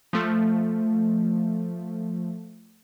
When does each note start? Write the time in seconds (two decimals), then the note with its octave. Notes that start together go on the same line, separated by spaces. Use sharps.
0.13 F3 A3